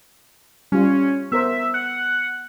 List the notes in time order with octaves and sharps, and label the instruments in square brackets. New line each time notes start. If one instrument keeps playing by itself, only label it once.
[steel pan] G3 F4 [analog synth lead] C#4
[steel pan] B3 A#4 C5 [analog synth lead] E5
[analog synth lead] F#5